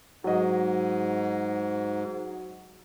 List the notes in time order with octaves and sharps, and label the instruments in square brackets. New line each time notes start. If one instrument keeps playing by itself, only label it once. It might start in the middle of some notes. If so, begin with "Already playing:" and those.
[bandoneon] G#2 [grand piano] F#3 D#5